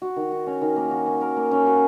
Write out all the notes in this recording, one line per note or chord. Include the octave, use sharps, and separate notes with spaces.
F#4
D#3
F#4
C#4
D#3
A#3
F#4
C#4
A#4
A#3
C#4
F#4